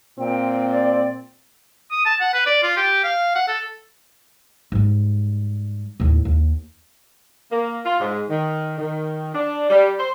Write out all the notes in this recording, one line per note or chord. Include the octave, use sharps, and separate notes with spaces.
A#2 C4 G5
D5
D#6
A5
F#5
B4
D5
F4
G4
F5
F#5
A4
G#2 G3
D#2 A2
D#2
A#3
F4
G#2
D#3
D#3
D4
G3
C5